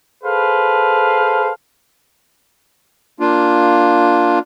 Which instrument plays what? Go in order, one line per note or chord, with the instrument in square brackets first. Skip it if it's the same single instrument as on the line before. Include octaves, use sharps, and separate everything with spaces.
[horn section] G#4 A4 B4 C5 F5
[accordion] A#3 D4 F4